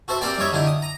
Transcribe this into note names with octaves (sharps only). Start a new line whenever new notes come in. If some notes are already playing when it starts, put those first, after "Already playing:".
F#4 A4 C5 E5
A#3 C4 G4 D5 G5
G3 D#4 C#5 E5
D3 D#3 E4 G4
D#6
A#5